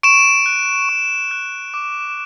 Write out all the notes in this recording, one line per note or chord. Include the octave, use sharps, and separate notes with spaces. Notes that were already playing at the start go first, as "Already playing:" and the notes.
C#6 D7 E7
F#6
C#6
F#6
D6